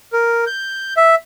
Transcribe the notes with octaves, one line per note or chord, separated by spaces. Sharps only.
A#4
G6
E5